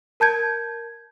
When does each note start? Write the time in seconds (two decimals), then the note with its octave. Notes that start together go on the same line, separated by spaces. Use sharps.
0.20 A#4 A5 G6 G#6